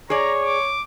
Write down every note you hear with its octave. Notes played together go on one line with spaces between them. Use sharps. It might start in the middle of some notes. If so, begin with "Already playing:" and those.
G#4 C#5 D5 A#5
D6